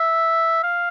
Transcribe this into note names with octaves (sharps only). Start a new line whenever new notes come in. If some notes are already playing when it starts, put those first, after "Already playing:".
Already playing: E5
F5